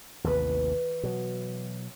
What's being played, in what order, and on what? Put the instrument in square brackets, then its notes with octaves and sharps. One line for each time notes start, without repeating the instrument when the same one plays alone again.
[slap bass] A1 D#2 C3 [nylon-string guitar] E3 B4
[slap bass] B2 F#3